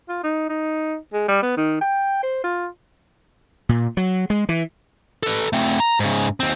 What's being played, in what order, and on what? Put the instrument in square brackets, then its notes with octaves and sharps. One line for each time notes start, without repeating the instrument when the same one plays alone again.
[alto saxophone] F4
D#4
D#4
G#3
G3
B3
D#3
G5
C5
F4
[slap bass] A#2
F#3
G#3
E3
[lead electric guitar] A4 B4
A3 C4
A#5
G#2 C#3
D#2 C4